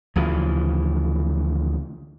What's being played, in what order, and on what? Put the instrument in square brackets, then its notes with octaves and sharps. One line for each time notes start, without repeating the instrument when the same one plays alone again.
[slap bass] D2 C#3 E3 F3